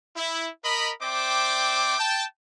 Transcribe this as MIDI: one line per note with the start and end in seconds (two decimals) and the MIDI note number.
0.16 0.48 64
0.64 0.91 70
0.64 0.91 75
0.64 0.91 83
1.01 1.97 60
1.01 1.97 72
1.01 1.97 74
1.01 1.97 76
1.01 1.97 79
1.01 1.97 86
1.98 2.24 79
1.98 2.24 81